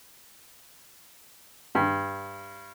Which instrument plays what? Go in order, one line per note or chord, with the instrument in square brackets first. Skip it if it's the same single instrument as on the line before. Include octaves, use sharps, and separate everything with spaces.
[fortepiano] G2